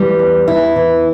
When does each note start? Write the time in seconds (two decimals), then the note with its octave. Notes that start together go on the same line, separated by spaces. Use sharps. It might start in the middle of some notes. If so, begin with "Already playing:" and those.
Already playing: E3 G3
0.19 E2
0.47 E2 E4
0.76 E3